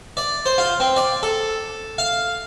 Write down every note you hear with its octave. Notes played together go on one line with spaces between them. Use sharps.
D5
C5
F4
C4
D5
A4
F5